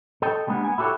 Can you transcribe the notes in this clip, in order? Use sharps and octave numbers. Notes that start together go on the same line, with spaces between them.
A4 D#5 G5
G3 G#3 A#3 B3 D4
B3 G5 G#5
E4 F#4 G4 A4 C#5